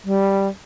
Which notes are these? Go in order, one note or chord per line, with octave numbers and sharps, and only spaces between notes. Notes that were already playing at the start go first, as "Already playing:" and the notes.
G3